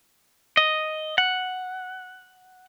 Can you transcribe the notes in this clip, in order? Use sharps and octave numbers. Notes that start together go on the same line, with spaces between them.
D#5
F#5